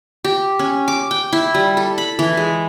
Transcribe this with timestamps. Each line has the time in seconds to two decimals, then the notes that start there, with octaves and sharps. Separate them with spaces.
0.24 G4
0.59 C#4
0.88 D6
1.11 G5
1.33 E4
1.54 G3
1.77 A4
1.98 B5
2.19 E3
2.37 G#3